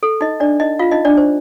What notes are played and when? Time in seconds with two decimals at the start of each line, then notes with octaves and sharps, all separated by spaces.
0.03 A4
0.21 D#4 D#5
0.40 D4 D5
0.60 D#4 D#5
0.79 F4 F5
0.91 D#4 D#5
1.05 D4 D5
1.17 C5